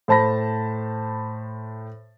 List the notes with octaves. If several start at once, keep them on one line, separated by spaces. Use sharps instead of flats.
A2 C5 A5 B5 A#6